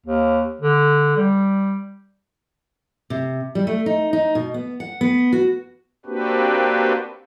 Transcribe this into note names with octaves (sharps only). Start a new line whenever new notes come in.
D#2
D3
G3
C3
G3
A3
D#4
D#4
B2
B3
F#5
B3
F#4
A#3 C4 D4 F#4 G4 B4